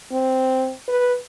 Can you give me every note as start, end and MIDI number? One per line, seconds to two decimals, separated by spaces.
0.12 0.73 60
0.88 1.15 71